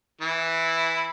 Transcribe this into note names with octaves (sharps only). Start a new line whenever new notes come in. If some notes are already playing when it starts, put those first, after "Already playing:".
E3 E4